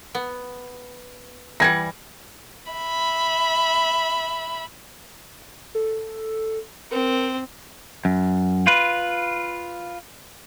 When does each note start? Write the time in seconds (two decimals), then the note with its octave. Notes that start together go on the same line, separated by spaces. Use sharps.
0.15 B3
1.60 E3 G3 F#5 G#6 A#6
2.71 E5 B5
5.75 A4
6.91 C4 A#4
8.05 F#2
8.67 F4 B4